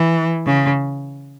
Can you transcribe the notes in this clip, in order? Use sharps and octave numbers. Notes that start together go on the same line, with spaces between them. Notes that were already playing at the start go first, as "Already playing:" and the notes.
Already playing: E3
C#3